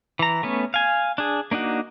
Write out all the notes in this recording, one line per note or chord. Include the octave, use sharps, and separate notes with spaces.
E3 A#5
A3 B3 C#4
F5 G#5
D4 G#4
A#3 D4 D#4 F#4